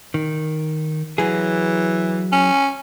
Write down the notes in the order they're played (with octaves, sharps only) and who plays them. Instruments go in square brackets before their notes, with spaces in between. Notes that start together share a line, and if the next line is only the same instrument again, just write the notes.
[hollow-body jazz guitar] D#3
[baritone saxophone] E3 [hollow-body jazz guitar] F#3 G#4
[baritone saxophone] C#4